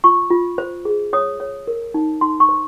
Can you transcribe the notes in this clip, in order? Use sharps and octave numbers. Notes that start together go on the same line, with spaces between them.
F4 C#6
F4
C5
G#4
C#5 D#6
C#5
A#4
D#4
D#4 C6
C#6
C5